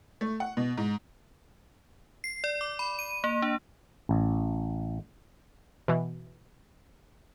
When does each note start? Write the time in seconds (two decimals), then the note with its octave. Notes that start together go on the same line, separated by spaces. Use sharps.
0.21 A3
0.40 F#5
0.57 B2
0.78 G#2
2.24 C7
2.44 D5
2.61 D6
2.79 B5
2.99 D#7
3.24 A#3
3.42 D4
4.09 A1
5.88 B2 E3